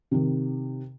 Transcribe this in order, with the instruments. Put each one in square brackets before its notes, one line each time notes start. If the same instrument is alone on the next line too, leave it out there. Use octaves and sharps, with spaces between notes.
[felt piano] C3 D#3